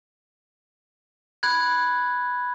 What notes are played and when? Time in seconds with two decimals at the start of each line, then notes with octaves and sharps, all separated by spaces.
1.43 B5 F#6 G#6